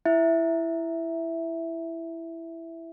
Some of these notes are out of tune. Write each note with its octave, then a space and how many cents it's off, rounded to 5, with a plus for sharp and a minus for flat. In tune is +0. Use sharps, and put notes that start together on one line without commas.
E4 +10 E5 +0